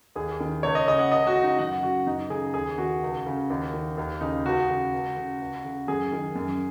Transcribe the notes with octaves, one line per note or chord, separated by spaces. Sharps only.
D#2 G#4
D#3
C#2 C#5
D#5
C#3 D#5
F#5
C#2 D#5
F#4
C#3
D#4
F#2 F#5
C#3 F#4
F#2 D#4
C#3 G#4
D#2 G#4
D#3 F#4
C#2
C#3
D#2
D#3
D#2
C#3 D#4
C#2 F#4
C#3
C#2
C#3
C#2
C#3
F#2 G#4
D#3
F#2